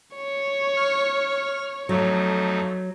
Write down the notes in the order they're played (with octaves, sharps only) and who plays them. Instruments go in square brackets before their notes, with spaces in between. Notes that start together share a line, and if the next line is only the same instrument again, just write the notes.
[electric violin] C#5
[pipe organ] F6
[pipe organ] F2 A3 D#4 [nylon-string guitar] F#3